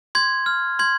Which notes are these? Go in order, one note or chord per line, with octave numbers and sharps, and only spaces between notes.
C6 G#6
F6
C6 G#6